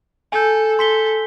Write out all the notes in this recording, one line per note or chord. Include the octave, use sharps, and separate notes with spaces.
A4 G#5 G6
A4 C6 B6 G7